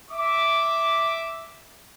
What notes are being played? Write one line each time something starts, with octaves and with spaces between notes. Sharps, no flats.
E5 D6